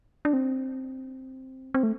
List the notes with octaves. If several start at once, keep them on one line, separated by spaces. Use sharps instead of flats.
D4
C4
C4
A3